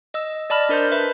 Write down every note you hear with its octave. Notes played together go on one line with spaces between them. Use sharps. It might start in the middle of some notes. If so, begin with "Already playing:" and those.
D#5 E6
D5 D#5 A5 B5 F6
D4 A#4 C5 C6 G6
B4 E5